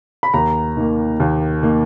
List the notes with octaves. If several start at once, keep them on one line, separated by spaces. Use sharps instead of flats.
B5
D#2 A#5
D#3 A#3
D#2
D#3 A#3